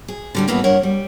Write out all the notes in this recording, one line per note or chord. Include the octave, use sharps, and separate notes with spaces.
G#4
D3 G3 C#4
A2 E3 A#3 B3 E4 F#4
G2 A#4 C#5 F#5
G3